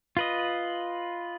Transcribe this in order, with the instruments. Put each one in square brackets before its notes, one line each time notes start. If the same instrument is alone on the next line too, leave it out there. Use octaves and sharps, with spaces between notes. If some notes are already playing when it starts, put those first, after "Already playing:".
[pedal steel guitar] F4 B4 D#5